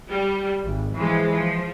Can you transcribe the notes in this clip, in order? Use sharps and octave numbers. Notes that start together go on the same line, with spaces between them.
G3
G#1
E3 F3 G#3
F3